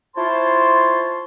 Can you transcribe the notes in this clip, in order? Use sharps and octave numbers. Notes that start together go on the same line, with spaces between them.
E4 F4 C5 C#5 A5 C6